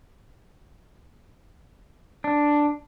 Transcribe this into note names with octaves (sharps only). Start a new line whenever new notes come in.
D4